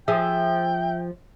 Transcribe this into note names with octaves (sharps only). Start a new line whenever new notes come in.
F3 G#4 E5 G5